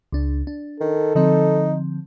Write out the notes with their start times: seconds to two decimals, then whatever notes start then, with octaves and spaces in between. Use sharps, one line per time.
0.13 C#2 D4
0.47 D4
0.80 D#3 A4
1.15 D3 F3 C4 D#4